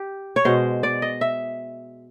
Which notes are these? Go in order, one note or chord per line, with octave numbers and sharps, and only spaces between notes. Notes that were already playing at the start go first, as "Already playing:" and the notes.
Already playing: G4
C#5
B2 G#3 C5
D5
D#5
E5